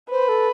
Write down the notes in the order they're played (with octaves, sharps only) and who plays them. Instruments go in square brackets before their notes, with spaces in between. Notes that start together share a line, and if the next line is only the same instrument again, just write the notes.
[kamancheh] B4 [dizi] C5
[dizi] A4